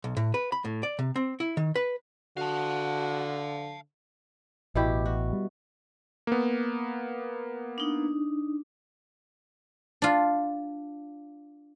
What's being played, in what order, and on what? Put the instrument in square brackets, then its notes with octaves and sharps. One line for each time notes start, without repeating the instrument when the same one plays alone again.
[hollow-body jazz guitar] B1
A2
B4
B5
A2
D5
C3
C4
E4
D#3
B4
[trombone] D3 [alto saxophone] F#4 [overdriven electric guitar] F5 A5
[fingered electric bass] A1 [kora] B2 E4 G4
[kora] F#4
[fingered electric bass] G3
[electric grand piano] A#3 B3
[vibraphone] D4 D#4
[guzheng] D4 F4